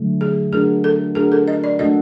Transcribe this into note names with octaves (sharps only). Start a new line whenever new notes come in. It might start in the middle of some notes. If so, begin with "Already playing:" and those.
Already playing: D3 F#3 A3
G#4
A3 D4 F#4 G#4 A#4
A4
A3 D4 F#4 G#4 A#4
A4
D#5
D5
A3 D4 F#4 A4 D#5